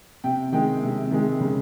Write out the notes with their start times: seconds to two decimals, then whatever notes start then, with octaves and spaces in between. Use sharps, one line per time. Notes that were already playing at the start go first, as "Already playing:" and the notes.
0.24 C3 G5
0.52 D#3 G#3 G5
0.83 C3
1.11 D#3 G#3
1.40 C#3